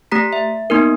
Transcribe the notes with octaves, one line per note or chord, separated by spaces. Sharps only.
A3 G4 A#5 B6
E5
A#3 B3 D#4 A#4